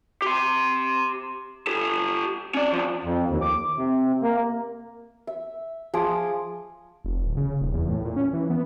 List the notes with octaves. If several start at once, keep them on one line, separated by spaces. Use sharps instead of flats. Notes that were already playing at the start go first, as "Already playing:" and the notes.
G4 C6
G4 A4
C#4 D5
E2 F3
F2
D#2
D6
C3
A#3
E5
F3 G#4 D6 D#6
F1
D1
C#3
D#1
E2
A2
A#2
C#4
E3
B3